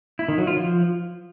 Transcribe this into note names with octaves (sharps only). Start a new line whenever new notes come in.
E4
D#3
F#3
F4
F3